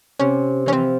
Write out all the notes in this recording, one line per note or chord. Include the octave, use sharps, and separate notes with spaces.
C3 C#4
E3 C#4
F3 C4